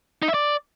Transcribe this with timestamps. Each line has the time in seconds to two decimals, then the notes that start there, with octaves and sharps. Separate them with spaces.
0.22 D#4
0.28 E5
0.34 D5